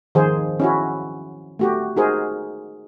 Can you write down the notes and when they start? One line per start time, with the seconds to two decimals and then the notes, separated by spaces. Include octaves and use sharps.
0.15 D#3 F3 G#4 C5
0.60 C#4 E4 F#4
1.59 A3 F#4 G4
1.97 D#4 F#4 G#4 A#4 C5